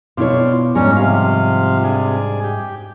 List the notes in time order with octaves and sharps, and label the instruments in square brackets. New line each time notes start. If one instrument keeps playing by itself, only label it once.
[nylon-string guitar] B2 E4 C#5 [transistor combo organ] C4 D4 F4
[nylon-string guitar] G#2 G3 [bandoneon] C#4 [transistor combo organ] D4 A#4 C#5
[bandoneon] C3 [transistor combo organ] F3 F5
[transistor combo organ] D4 G#4
G4